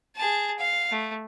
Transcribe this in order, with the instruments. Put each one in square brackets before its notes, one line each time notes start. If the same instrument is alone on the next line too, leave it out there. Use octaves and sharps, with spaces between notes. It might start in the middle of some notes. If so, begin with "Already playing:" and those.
[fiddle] G#4 A5
F5
A3